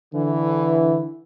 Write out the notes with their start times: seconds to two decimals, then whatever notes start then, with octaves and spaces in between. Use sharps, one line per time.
0.13 D3 E3